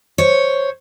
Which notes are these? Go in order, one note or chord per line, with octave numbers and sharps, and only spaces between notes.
C5 C#5